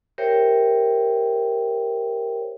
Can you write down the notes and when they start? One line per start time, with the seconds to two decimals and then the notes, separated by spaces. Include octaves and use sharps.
0.18 G4 A#4 C5 C#5 E5 G5